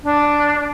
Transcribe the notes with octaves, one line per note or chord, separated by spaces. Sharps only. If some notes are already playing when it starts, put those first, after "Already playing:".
D4